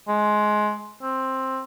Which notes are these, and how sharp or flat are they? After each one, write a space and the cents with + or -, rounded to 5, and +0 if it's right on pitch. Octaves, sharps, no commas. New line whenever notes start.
G#3 +20
C4 +10